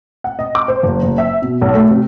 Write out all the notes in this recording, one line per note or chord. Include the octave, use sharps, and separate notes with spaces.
F#5
D#5
D6
C5
F#1
F#1
E5
B2
B1
A3
C3